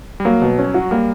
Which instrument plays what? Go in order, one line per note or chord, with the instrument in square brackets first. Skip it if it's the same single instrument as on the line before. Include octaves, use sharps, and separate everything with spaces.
[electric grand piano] G3
[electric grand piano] F#3 [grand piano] A#3
[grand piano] B2
C#4
F#4
[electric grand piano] G3 [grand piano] A#3